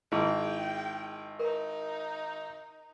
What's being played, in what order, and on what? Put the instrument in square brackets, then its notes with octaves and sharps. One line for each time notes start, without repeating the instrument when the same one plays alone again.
[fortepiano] G#1 [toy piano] E4 F4 G#4 [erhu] G5
[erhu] D#4 [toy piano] A#4